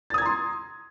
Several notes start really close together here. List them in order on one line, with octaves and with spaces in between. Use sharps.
A6 D#6 G#6 A#5 C6